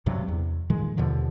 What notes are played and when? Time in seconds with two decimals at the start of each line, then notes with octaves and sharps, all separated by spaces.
0.06 D2 G2 C3 F#3
0.28 E2
0.70 A#2 D#3 F3 G#3
0.97 D#2 B2 D3 F3